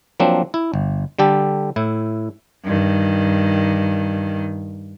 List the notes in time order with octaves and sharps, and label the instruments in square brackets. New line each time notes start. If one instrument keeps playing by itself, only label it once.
[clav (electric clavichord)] F3 F#3 A#3 C4 D4
E4
G1
D3 G3 G4 A4
A2 E4
[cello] G2 D#3